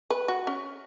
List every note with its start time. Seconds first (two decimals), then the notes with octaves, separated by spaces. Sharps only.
0.10 B4
0.28 F#4
0.47 C#4